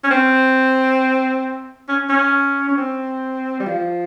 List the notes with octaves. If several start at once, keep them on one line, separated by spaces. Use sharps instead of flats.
C#4
C4
C#4
C#4
C#4
C4
G3
F3